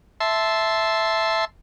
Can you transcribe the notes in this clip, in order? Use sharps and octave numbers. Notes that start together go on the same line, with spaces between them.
E5 A5 C6